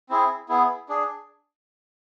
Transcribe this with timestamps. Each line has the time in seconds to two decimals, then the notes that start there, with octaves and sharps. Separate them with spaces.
0.10 C4 E4 G#4
0.49 B3 E4 G#4
0.89 D4 G#4